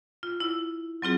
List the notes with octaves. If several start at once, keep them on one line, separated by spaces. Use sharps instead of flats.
F4
E4
F#3 C4 F4 G#4